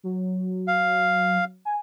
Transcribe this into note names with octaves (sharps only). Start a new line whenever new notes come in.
F#3
F5
G#5